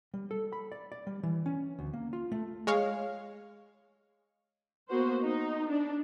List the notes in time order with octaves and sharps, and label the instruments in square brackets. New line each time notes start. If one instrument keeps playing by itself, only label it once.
[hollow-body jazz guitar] G3
A4
B5
D5
D5
G3
E3
C#4
D2
A#3
F4
A3
[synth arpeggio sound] G#3 C#5 F5
[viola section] A#3 B3 F#4 C5
D#4
D4